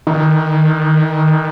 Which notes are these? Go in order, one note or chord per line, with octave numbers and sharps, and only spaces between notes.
D#3